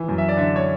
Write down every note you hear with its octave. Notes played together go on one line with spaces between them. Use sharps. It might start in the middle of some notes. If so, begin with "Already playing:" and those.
Already playing: E3
F#2
E5
D5
D3 E5
C#5